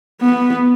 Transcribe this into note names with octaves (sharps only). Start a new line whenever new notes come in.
B3